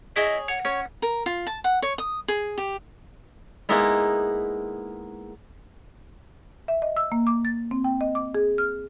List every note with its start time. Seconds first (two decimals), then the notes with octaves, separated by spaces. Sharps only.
0.16 E4 G#4 C#5 D#5
0.48 C#5 F#5
0.65 C#4 C#5
1.02 A#4
1.26 F4
1.47 A5
1.64 F#5
1.82 C#5
1.98 D#6
2.28 G#4
2.58 G4
3.69 G#3 A#3 B3 D#4 E4
6.68 E5
6.82 D#5
6.97 E6
7.12 A#3
7.27 D6
7.45 A6
7.71 C4
7.84 G5
8.01 D#5
8.15 D6
8.35 G#4
8.58 F6